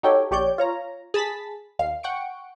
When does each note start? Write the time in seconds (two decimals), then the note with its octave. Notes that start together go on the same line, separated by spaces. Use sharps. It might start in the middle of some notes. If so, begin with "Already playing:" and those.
0.03 D#4 F#4 G4 A4 C#5 G5
0.31 A#1 G4 C#5 D5 G6
0.58 F4 C#5 A#5
1.14 G#4 A5 B5 A6 B6
1.79 D#2 F5 C7
2.03 F#5 G5 C#6 C#7 D7